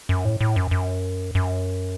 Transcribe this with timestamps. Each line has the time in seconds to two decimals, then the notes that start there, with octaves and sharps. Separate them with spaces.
0.09 F#2
0.25 A2
0.41 A2
0.56 F#2
0.71 F#2
1.35 F#2